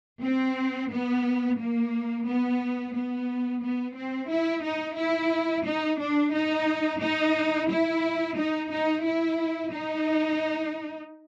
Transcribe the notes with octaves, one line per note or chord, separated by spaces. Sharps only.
C4
B3
A#3
B3
B3
B3
C4
E4
D#4
E4
D#4
D4
D#4
D#4
E4
D#4
D#4
E4
D#4